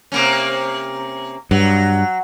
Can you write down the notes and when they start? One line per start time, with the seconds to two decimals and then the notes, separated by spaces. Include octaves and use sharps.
0.12 C3 A#3 C#4
1.51 G2 F#3